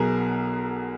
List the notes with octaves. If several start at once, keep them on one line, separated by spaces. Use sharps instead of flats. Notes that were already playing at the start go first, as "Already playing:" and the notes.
Already playing: B1 B2 F#3 G#4 A#4